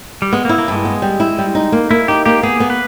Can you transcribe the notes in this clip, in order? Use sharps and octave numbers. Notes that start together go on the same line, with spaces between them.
G3
G#3 B3
A#3 E4
A#3
G2 G#3
B3
G3
E4
G3
D#4
A#3
A#3 E4
D#4 G4
A#3 G4
B3 G#4
B3
B4